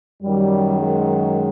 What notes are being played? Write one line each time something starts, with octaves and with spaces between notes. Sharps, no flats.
F#2 D#3 F#3 G3
G#3